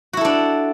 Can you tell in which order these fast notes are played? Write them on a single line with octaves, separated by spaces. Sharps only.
F#4 E4 A4 D4